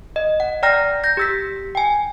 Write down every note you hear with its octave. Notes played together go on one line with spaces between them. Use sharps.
D#5
F#5
D5 G5 A#5 F6 A#6
G6 A#6
G4 E6 B6
G5 G#5